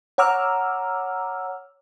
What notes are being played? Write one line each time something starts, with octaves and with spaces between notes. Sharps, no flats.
C#5 F#5 A#5 D6 E6 F6